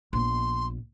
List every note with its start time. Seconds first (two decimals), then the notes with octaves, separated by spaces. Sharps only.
0.13 A#1 B3 C6